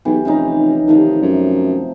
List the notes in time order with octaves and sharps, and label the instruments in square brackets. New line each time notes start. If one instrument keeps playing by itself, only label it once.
[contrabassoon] B1 [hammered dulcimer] E3 G4
[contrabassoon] F1 [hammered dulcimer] E3 C#4 D#4
[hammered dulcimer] C3 F3 A3 [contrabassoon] D#3
[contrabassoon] F#2